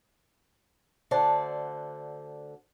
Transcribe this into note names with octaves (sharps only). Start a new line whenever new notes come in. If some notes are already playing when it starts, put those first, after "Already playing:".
D2 D3 C5 D5 F#5 A5